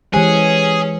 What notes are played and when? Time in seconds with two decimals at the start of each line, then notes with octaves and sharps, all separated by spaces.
0.13 E3 G#3 C#4 G4 G#4 C5 G#5